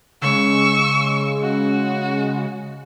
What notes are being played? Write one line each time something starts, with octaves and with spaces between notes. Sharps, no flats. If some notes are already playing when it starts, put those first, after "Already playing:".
C#3 G#3 C#6 E6
F#4